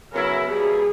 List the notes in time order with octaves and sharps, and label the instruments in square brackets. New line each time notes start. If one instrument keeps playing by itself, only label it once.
[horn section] C#3 F#3 B3 E4 [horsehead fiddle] A#4
[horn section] B2 G3 A#3 [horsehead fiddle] G#4